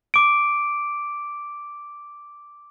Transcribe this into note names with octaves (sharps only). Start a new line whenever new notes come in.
D6 D7